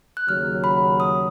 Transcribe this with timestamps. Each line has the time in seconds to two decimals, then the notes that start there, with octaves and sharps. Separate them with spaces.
0.17 F#6
0.28 D#2 C#3 F#3 F6
0.64 B5
1.00 D#6